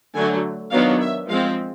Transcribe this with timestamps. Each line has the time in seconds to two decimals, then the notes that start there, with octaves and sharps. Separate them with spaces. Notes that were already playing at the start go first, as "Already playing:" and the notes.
0.15 D3 F#3 A3 G#5
0.71 D#3 F#3 B3 D4 F5
1.00 E5
1.28 F3 G#3 C4 F5